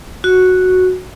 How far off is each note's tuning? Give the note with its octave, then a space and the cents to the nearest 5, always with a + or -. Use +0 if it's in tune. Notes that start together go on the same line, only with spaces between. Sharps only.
F#4 -5